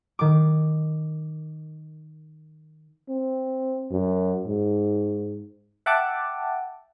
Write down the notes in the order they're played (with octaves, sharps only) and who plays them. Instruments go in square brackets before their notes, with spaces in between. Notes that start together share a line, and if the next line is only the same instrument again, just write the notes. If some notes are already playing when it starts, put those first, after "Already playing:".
[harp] D#3 D6
[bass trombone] C4
F#2
G#2
[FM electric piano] E5 F#5 G5 A5 D6